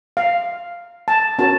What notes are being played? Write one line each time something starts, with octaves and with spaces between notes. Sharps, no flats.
F5
A5
C#4 F#4 A#4 C#5 A5